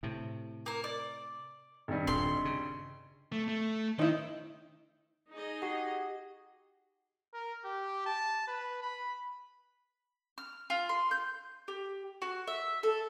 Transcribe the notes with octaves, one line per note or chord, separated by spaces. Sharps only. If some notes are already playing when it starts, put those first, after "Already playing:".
A2 C3
A#3 A#4
D5
G#1 G2
D#1 C6
C#3
A3
A3
D#3 D#4 E4
D#4 G#4 D#5
F#4 G4 F#5
A#4
G4
A5
B4
B5
F6
F4
C6
G6
G4
F#4
E5
A4